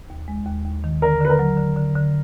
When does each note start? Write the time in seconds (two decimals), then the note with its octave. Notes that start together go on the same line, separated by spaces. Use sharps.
0.10 D#2
0.28 G#3
0.46 D#2
0.65 D#2
0.84 D#3
1.02 D3 A#4
1.20 D3 B4
1.30 A#4
1.39 F#3
1.57 D3
1.76 D3
1.96 D3